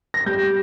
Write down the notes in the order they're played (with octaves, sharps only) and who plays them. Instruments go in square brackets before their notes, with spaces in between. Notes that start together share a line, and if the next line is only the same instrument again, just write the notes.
[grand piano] A#6
G3 G6